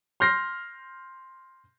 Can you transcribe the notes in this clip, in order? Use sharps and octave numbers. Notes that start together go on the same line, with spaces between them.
C6 F6 G6 A#6 C7